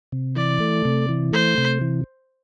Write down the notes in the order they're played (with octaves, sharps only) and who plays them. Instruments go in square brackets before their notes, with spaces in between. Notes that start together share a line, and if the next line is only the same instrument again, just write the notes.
[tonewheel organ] C3
[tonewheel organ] E3 [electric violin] D5
[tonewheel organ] A3
C3
E3
[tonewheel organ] A3 [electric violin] C5
[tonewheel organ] C3
E3